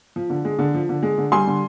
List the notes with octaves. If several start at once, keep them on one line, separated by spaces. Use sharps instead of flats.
F3
D3
G#3
D3
F3
D3
G#3
D3
G3 G#5 C6
D3